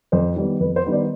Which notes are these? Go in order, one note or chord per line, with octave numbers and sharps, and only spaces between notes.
F2 C5
D#3 G3 B3
F2 B4
C5
D#3 G3 B3
D5